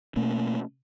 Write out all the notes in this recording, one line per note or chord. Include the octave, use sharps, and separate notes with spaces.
B2 A3 A#3 C#4